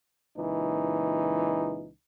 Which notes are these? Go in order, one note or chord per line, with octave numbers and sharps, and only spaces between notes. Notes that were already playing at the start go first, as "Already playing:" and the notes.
C#2 A#2 E3 D#4